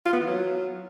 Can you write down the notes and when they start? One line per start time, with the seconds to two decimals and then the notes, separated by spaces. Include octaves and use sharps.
0.06 F4
0.13 B3
0.20 E3
0.27 F#3